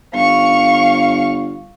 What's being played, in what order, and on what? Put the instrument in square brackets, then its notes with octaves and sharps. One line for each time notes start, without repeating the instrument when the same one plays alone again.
[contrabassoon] G1 [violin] F5 C#6